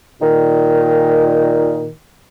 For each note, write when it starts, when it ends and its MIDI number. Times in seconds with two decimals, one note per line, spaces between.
0.21 1.87 46
0.21 1.87 51